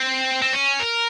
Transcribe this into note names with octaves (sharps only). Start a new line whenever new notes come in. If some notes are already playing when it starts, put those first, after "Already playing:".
Already playing: C4
C4
C#4
A#4